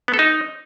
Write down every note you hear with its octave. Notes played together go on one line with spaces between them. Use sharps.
B3
A4
D#4